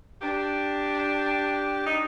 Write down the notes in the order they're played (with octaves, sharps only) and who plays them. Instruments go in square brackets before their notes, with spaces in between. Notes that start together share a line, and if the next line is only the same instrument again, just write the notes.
[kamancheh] D4 [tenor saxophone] G4
[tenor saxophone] D#4